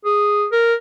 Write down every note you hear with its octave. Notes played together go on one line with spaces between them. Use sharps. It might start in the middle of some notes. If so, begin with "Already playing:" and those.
G#4
A#4